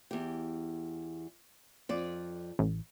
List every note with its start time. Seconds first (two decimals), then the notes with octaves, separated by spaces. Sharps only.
0.11 E2 G4
1.89 F2 D5
2.59 A1